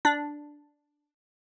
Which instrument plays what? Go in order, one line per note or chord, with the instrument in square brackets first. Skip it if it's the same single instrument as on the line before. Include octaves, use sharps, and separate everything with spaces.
[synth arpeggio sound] D4